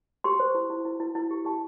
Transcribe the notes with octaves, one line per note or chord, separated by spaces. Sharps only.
G4 C6
C5
E4
E4
E4
E4
E4
G4
G4 A5